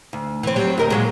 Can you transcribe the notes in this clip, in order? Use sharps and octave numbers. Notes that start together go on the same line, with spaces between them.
D2
E3 C4
F#3 G3 C4
D2 A#4 D#5
A#2 F#3 G#3